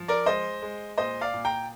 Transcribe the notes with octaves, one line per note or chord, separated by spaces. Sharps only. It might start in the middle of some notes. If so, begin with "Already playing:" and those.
Already playing: F3
A#4 D5
G#3 C5 D#5
G#3
A#2 C5 D#5
D5 F5
A#2
G5 A#5